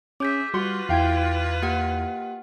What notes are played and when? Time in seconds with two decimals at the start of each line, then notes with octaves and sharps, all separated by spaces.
0.20 C#4 G#4 E5 D6 G6 B6
0.54 G3 F4 F#4 B4 C6
0.89 E2 E4 F5 G5 G#6
1.62 A#3 G4 F#5